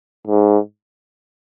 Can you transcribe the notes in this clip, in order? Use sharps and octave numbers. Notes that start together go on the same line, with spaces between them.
G#2